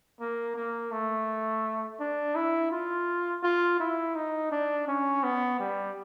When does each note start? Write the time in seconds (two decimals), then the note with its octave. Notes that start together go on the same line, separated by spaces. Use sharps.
0.20 A#3
0.56 A#3
0.92 A3
2.00 D4
2.35 E4
2.71 F4
3.43 F4
3.80 E4
4.16 D#4
4.52 D4
4.88 C#4
5.23 B3
5.60 G3